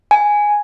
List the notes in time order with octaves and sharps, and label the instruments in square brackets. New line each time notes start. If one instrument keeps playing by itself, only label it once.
[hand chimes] G#5